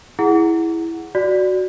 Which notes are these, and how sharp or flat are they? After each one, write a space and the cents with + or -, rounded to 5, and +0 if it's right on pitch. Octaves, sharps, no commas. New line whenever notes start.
E4 +0 G#4 +0 F#5 +0
F#4 +0 D5 +0